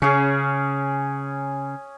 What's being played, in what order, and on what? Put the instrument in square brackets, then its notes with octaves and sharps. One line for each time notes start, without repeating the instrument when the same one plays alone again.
[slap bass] C#3 [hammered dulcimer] C#4 G#4